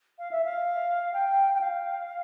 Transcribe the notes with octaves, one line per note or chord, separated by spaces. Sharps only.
F5
E5
F5
G5
G5
F5